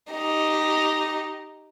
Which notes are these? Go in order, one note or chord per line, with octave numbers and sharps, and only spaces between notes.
D#4 G4